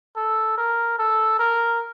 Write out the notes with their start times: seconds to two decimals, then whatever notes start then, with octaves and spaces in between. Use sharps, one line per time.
0.16 A4
0.58 A#4
0.99 A4
1.39 A#4